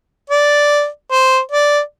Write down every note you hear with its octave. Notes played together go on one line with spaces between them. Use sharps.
D5
C5
D5